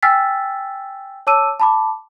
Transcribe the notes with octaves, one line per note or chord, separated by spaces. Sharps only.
G5 G#5 E6 F6 A6 B6
C#5 A5 D6 E6 D#7
A5 B5 D6